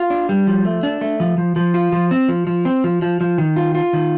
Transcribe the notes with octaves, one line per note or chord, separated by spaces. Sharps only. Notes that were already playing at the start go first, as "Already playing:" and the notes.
Already playing: F4
D4
G3
F3
A3
D4
A3
F3
F3
F3
F4
F3
C4
F3
F3
C4
F3
F3
F3
D#3
F4
F4
D#3